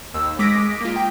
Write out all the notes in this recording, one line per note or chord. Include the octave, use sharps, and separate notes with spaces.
D#2 E6
G#3 D6 D#6 A#6 B6 D7
A#3 F4
G5